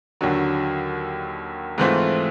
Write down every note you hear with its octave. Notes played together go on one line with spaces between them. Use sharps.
D#2 D3 F#3
G#2 E3 A3 C4 F4